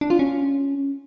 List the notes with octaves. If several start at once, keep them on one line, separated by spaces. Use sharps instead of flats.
D4
F4
C#4